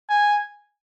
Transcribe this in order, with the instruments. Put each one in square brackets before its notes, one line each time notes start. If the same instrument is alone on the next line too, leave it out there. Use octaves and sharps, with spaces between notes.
[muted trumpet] G#5